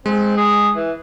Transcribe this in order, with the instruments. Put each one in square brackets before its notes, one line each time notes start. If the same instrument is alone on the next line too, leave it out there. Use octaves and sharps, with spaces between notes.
[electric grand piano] G#3 [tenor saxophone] C4
[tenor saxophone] G#4
E3